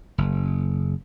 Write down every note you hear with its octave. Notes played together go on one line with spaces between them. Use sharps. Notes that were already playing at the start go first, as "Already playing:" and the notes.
F#1